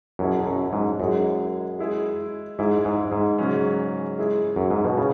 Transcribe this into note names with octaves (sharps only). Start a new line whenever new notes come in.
F#2 B2 F#3 C#4 E4 G#4
F#2
G#2
F#2 G#3 E4 G#4
G#3 E4 G#4
G#2 G#3 E4 G#4
G#2
G#2
C#3 F#3 C#4
G#3 E4 G#4
F#2
G#2
B2
C#3 G#3 E4